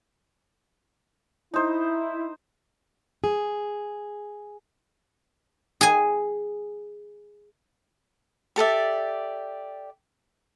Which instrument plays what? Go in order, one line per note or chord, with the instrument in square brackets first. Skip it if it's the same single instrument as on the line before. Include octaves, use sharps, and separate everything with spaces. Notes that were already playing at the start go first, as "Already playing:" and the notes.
[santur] D#4 C5 [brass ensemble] E4
[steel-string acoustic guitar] G#4
[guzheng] G#4 G#5
[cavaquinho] G4 A4 D5 E5